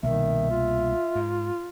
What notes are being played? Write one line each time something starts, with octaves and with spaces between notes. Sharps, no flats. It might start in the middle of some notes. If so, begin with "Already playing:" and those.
C2 B2 D#3 A#3 E5
F4
G#2